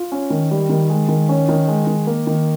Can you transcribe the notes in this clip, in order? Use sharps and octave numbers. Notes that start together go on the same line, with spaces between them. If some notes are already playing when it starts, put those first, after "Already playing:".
Already playing: F4
C#4
D#3
G3
D#3
G#3
D#3
C#4
D#3
G#3
D#3
A#3
D#3